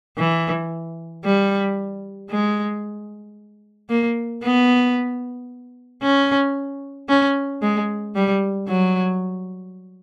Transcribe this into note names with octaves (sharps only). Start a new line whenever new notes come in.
E3
G3
G#3
A#3
B3
C#4
C#4
G#3
G3
F#3